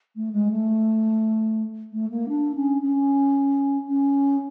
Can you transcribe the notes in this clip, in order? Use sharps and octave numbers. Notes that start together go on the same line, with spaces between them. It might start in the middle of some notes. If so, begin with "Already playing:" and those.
A3
G#3
A3
A3
A#3
D4
C#4
C#4
C#4